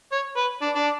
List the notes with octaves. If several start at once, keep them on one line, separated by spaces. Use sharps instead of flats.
C#5
B4
D4
D4